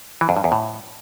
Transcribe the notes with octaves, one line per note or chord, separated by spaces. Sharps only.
E3
F2
G2
E2
A2